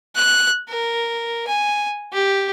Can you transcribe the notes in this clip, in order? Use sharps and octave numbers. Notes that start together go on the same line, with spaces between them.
F#6
A#4
G#5
G4